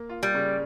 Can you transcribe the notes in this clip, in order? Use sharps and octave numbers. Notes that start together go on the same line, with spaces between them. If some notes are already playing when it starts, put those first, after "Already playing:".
Already playing: A#3
F4
G3
C#3